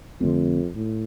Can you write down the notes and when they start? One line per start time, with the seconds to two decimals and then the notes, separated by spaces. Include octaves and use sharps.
0.21 F2 D3 A3 C4
0.76 A2